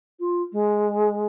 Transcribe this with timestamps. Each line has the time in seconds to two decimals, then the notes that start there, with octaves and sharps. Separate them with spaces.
0.20 F4
0.52 G#3